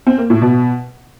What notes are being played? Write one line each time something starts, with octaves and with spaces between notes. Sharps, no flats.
C4
A#3
A2
B2